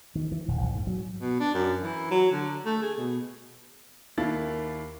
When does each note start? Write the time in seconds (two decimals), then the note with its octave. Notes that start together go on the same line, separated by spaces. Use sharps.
0.15 D#3
0.32 E3
0.48 D#1
0.61 A#1
0.75 G#2
0.87 F#3
1.20 B2
1.40 D4
1.54 F#2
1.82 E3
2.11 F#3
2.32 D3
2.65 A3
2.82 G#4
2.97 B2
4.18 D#2 A#3 E4 A6